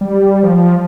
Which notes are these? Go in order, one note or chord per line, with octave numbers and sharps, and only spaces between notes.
G3
F3